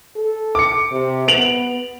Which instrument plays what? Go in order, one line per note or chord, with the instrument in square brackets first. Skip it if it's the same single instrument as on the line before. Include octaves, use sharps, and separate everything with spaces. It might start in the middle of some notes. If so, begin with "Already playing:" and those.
[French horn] A4
[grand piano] D6 C#7
[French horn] C3
[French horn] B3 [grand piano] D7 F7 F#7